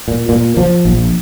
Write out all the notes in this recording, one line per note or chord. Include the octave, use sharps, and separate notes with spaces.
A#2
A#2
F3
A#1